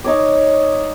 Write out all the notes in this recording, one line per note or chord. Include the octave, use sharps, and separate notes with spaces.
D#4 C#5 D6